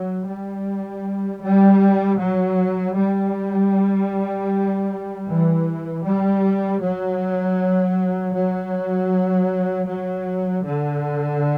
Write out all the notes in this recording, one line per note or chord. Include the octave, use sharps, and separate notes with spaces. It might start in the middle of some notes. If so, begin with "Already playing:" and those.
Already playing: F#3
G3
G3
F#3
G3
E3
G3
F#3
F#3
F#3
D3